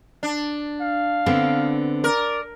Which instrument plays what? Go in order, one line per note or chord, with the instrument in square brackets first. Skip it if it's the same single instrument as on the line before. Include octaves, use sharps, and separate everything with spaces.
[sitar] D4
[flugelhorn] F5
[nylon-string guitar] D3 B3 C4
[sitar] A#4 [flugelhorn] D5